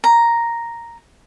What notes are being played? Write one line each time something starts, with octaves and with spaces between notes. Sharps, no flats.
A#5